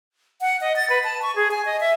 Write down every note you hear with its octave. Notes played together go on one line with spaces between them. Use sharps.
F#5
D#5
A6
B4
A5
C#6
G#4
G#5
D#5
E5